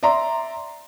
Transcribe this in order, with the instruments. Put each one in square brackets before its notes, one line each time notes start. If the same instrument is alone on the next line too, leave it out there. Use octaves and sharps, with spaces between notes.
[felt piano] D5 E5 A#5 C6